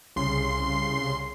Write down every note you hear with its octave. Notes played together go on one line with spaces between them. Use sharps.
C2 C#3 C6 C7